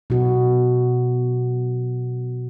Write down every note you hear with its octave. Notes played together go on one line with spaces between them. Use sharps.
B2 F#4